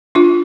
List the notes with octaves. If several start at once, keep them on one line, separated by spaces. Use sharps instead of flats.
D4 F4